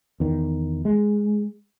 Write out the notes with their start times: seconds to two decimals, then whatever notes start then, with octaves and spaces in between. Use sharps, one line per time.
0.20 E2 D#3
0.85 G#3